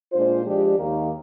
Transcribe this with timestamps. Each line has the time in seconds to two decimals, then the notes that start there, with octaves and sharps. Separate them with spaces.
0.12 A#2 G#3 D4 F4 C5
0.45 F3 G#3 D4 G4 D5
0.78 D#2 D#3 A#3 D#4 G4